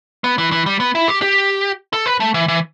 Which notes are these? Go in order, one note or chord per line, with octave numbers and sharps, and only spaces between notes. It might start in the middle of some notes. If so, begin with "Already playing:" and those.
B3
E3
E3
G3
B3
E4
G4
G4
A4
B4
A3
E3
E3